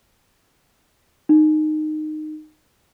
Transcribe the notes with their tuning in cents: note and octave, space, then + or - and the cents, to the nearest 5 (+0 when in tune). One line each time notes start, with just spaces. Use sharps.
D#4 -15